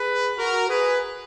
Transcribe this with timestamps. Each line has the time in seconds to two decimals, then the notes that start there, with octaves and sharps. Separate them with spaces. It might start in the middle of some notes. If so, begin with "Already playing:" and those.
Already playing: G#4 B4
0.38 F#4 A#4
0.69 G#4 B4